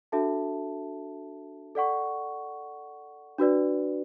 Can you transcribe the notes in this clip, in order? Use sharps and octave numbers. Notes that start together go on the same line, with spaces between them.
D4 F#4 A4 E5 A5
A4 D5 F#5 C#6
D4 F#4 B4 D5